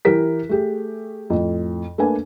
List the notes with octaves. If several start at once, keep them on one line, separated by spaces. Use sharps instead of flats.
E3 E4 G4 A#4 B6
A3 G4 G#4
F2 A2
A3 A#3 D4 B4 G#5